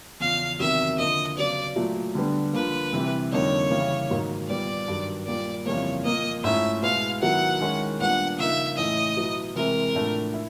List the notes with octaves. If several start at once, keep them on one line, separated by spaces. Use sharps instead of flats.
E2 C#3 F3 F5
E2 C3 D#3 F#3 E5
D3 F3 A#3 D#5
C#3 F#3 B3 D5
A#2 F#3 A3
D3 G3 B3 D4
D3 F3 A#3 B4
C3 E3 G3
F2 D3 G3 A#3 D#4 C#5
C#3 E3 G3 A#3
G#2 D#3 F#3 A#3 D#4
A#2 G3 B3 D5
G2 D#3 F#3
A#2 G3 A#3 D5
F2 C#3 E3 G3 A#3 C#5
A#2 F3 A#3 D#5
G#2 F3 A3 C#4 E4 E5
B2 G#3 B3 E4 F5
D#3 F#3 B3 E4 F#5
D#3 G#3 C#4 E4
A#2 G3 B3 D4 F#5
C#3 F3 A#3 D#4 E5
A2 E3 A3 C#4 E4 D#5
B2 F#3 B3 E4
C3 E3 G#3 C4 E4 A#4
A2 F3 A3 D4
E4